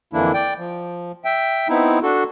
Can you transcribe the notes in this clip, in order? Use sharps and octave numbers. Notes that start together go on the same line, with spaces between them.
F2 D3 E3 A#3 D4 E4
D5 G5
F3
E5 G5
B3 C4 D#4 E4
D4 F#4 A4